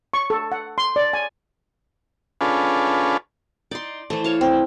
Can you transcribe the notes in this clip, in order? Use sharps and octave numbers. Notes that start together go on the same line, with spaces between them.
C#6
A4
F#5
C6
D5
G#5
C#4 D4 F4 G#4 A4 B4
D#4 D5 C6
E3 A3 C5
C#5 F5 A5
C4